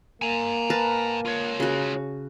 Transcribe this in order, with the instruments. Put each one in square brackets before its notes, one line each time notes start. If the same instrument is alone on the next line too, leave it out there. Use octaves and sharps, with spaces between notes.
[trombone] A#3 [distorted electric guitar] G#5 A#5
[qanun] A#4 B4 A5
[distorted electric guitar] F4 C#5
[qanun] C#3 F#4